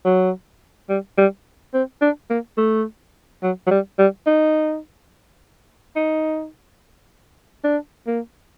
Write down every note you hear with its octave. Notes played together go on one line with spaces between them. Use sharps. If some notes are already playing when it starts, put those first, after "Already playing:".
F#3
G3
G3
C4
D4
A#3
A3
F#3
F#3
G3
G3
D#4
D#4
D4
A#3